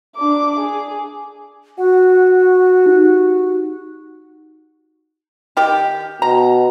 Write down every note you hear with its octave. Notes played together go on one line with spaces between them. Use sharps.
D4 D6
G#4
F#4 F#5
D#4 G4
D#3 G4
B2 A#5